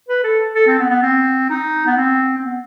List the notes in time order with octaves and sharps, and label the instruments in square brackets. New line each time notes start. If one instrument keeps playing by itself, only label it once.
[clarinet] B4
A4
A4
C4
B3
B3
C4
D#4
B3
C4
C4
B3